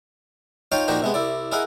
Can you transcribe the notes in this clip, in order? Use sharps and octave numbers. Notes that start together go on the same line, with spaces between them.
D#4 F4 C#5 D#5 G5 C6
A#2 F3 A#3 D#4 F#4 G4
C3 G#3 B3
C2 E4 D5
E4 G#4 A#4 D#5 F#5